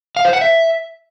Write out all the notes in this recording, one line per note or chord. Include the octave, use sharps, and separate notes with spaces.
F5
C5
F#5
E5